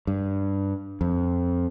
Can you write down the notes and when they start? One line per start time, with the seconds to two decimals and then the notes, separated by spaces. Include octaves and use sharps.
0.07 G2
1.01 F2